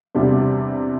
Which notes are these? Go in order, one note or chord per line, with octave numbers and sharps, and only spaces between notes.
E2 C3 G3 D4